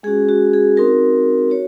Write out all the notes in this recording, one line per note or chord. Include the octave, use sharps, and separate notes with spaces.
G#3 C#4 F#4 G#4
F#4
G#4
C4 D#4 F#4 A#4
F#4 C#5